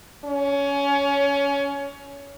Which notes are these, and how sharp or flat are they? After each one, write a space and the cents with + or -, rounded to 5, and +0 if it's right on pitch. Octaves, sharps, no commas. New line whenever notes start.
C#4 +20